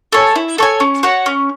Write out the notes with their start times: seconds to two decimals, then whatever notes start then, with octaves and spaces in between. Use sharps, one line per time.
0.12 A4 C#5 G#5
0.36 E4
0.58 A4 C#5 G#5
0.80 C#4
1.03 F#4 C#5 F#5
1.26 C#4